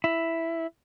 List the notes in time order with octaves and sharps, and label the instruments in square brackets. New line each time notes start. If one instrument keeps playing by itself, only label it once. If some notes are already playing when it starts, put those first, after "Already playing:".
[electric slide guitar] E4